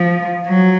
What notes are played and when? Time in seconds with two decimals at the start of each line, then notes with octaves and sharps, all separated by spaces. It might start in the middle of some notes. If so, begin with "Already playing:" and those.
Already playing: F3
0.48 F#3